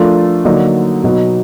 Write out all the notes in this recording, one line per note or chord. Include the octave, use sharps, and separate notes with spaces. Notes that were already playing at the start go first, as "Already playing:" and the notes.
Already playing: F3 A3 D4 F4 A#4
D3 F#3 A#3 D#4
B2 F#3 B3 D#4 F#4